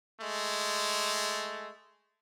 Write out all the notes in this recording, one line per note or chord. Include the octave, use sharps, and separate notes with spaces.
G#3 A3